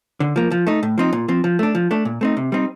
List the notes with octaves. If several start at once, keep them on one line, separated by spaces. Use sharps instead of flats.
D3
F3 A#3
F3
A3 D#4
A2
F3 C4 D#4
A#2
F3 C4
F3
A3 D4
F3
A3 D4
A#2
A3 C4 D#4
C3
G3 C4 D#4